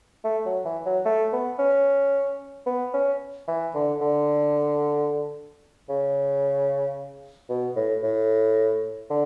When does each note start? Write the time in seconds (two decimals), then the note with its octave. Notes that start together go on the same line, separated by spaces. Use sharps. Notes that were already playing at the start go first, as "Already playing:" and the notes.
0.24 A3
0.46 F#3
0.65 E3
0.86 F#3
1.05 A3
1.33 B3
1.58 C#4
2.66 B3
2.93 C#4
3.47 E3
3.74 D3
4.01 D3
5.89 C#3
7.49 B2
7.76 A2
8.03 A2
9.10 D3